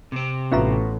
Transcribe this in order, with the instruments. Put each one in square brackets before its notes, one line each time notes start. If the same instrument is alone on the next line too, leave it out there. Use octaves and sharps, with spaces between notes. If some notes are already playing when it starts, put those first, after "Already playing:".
[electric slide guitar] C3 C4
[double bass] A1 [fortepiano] B3 F4 F#4 [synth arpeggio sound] C#4 E5 A#5